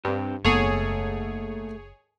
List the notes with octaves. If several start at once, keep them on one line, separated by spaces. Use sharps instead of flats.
G2 C4 G4
F#1 D#2 G#2 A3 B3 G#4 A4 C#5